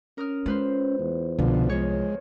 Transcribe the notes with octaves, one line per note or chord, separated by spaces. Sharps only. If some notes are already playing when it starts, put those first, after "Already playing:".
C#4 A#4 D#6 F6
G#3 F4 B4 C5
E2
C2 B2 D3 F3
E2 F3 G#3 C#5